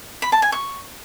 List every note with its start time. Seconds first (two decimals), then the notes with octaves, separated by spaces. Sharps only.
0.22 B5
0.32 A5
0.42 G#5
0.52 C#6